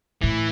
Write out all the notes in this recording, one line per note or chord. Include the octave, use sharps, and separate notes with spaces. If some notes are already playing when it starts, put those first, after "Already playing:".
A2 E3